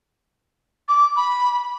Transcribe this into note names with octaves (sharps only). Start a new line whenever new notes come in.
D6
B5